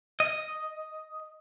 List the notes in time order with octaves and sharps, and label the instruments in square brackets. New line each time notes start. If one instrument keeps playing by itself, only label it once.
[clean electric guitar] D#5